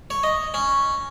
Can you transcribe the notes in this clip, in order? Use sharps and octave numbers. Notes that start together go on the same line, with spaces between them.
C#5
D#5
C#4